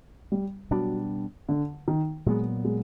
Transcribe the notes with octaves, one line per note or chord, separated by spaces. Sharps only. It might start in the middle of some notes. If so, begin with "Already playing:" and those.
G3
B2 F#3 G3 B3 D4
D3
D#3
A#2 F#3 G#3 B3
G#3